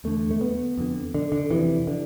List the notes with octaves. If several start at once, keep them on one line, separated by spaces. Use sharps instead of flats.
E2 D3 A3
A3
B3
F2 D3
D3
D3
F2 C3 E3
D3